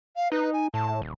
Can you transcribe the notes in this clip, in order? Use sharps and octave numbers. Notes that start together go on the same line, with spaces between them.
F5
D#4 B4
G#5
A2 A5
D#1